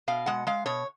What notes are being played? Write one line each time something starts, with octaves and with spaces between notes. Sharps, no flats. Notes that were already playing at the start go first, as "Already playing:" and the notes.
B2 F5
G#3 F#5
G#3 F5
B2 C#5